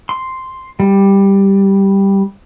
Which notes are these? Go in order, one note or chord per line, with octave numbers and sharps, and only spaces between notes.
C6
G3